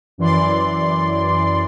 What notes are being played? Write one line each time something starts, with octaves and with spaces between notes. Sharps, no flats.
F#2 E3 D5 C6